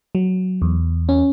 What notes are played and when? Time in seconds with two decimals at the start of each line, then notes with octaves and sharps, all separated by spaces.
0.15 F#3
0.62 E2
1.09 C#4